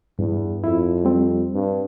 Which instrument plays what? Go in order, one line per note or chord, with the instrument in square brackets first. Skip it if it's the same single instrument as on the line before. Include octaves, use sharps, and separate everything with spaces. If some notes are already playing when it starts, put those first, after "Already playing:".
[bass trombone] E2 [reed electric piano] G2
[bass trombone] F2 [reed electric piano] E4
[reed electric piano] G3 C4
[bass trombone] G2